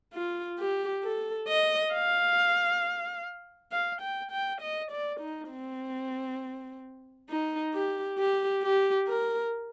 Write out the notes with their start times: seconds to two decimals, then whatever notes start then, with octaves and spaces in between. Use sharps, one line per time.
0.14 F4
0.59 G4
1.04 A4
1.48 D#5
1.93 F5
3.72 F5
4.02 G5
4.32 G5
4.61 D#5
4.91 D5
5.20 D#4
5.51 C4
7.29 D#4
7.74 G4
8.19 G4
8.63 G4
9.08 A#4